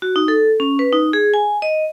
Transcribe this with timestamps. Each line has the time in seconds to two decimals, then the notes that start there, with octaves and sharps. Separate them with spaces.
0.02 F#4
0.16 D#4
0.28 A4
0.60 C#4
0.79 B4
0.93 D#4
1.13 G#4
1.34 G#5
1.62 D#5